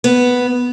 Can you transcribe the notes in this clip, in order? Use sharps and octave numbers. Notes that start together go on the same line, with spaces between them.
B3